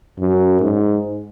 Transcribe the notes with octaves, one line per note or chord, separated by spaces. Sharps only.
F#2
G#2